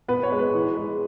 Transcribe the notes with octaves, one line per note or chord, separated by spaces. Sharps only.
B3 B4
C#5
G#3
B4
E3
G#3